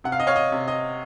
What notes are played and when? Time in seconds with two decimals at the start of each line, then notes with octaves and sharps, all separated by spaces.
0.04 C3 F#5
0.12 F5
0.20 D#5
0.27 C#5 F5
0.36 D#5
0.52 C3
0.68 D#5